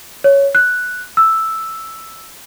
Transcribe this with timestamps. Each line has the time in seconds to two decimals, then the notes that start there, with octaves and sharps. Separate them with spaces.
0.24 C#5
0.55 F#6
1.17 E6